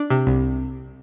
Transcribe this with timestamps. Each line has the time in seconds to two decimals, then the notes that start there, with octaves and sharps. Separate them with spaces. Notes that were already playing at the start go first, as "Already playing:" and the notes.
Already playing: D4
0.10 C3
0.27 C2